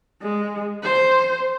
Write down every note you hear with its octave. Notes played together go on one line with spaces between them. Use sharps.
G#3
C5